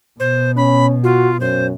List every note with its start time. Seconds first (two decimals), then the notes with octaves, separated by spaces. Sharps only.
0.20 B2 C5
0.57 C#4 B5
1.04 F4 F#4
1.40 F#2 C5